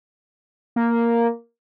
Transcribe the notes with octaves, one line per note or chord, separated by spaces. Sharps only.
A#3